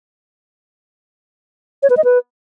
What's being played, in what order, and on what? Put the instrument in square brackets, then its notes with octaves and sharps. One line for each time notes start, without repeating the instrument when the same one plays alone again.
[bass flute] C#5
B4
D#5
B4